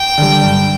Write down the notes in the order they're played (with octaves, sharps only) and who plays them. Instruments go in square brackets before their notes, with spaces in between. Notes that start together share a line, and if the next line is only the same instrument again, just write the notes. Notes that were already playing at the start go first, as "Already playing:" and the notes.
Already playing: [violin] G5
[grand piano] D3 G3
G2